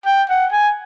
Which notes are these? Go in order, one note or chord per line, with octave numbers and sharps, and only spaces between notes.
G5
F#5
G#5